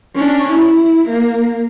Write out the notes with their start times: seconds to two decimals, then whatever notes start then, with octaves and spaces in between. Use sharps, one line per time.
0.15 C#4 D4
0.51 E4
1.09 A#3